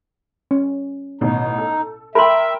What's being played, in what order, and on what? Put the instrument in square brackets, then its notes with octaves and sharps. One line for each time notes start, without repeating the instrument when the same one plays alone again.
[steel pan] C#4
[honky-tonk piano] A1 B2 D#3 [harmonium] D#4
[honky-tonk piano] A4
[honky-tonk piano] A#4 G5 [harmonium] E5 [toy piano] B5 C6